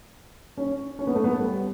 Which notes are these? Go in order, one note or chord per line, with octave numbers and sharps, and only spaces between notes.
C#4
C#4
B3
A3
B3
G3